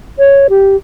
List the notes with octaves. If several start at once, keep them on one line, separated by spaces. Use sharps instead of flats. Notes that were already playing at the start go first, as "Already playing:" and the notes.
C#5
G4